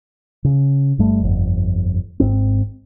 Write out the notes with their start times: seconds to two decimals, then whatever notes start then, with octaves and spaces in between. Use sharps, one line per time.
0.44 C#3
0.98 G1 G2 G3 A3
1.21 G1 F2
2.20 G#1 G#2 C4